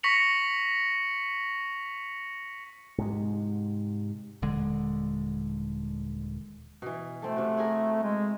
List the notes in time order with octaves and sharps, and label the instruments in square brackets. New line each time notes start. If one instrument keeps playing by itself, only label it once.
[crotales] C#6 A#6 B6 C#7 F7 F#7
[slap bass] G#2 C3 G#3
[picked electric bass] D#1 D3 G#3
[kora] B2 E3
[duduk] A3 [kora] C4 A4
[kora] C3 F#4
E4 G#4 A#4
[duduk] G#3